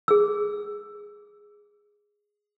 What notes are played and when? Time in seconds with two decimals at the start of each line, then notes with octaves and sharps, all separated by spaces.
0.08 G#4 E6